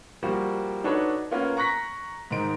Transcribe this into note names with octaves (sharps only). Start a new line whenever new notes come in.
F3 G3 A#3 F#4
D4 D#4 F#4 A4 B4 C#5
A#3 B3 C#4 F4 A#4
A#5 C#6 F#6 A#6 B6
G#2 D#3 D#4 D7